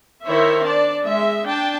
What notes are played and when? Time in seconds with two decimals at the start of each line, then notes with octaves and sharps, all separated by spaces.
0.24 D#3 E4 A#4 C5 C#5 E5
0.63 D4 D5 A5
1.04 G#3 E5
1.44 D4 G5 A5